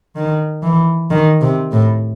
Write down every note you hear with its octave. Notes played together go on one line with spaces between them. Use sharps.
D#3
E3
D#3
C3
A2